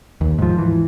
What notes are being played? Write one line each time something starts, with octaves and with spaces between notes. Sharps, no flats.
D#2
G#2 F3
E3